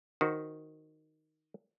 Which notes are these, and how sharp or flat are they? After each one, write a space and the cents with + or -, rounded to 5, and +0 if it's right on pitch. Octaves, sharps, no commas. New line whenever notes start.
D#3 +0 F#4 +0 C5 +0